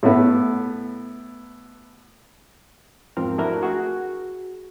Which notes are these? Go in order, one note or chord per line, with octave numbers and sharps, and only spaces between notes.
A2 B3
E2 G#2 F3 C4 A#4 F6
A3 D4 E4 F#4 A#4
F#4 G#4